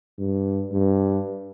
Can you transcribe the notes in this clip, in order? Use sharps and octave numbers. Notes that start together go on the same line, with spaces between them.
G2
G2